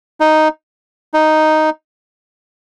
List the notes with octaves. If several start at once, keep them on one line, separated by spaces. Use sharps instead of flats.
D#4
D#4